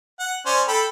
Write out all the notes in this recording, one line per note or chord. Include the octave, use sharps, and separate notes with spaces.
F#5
C#4 C5 D5
A4 G5 B5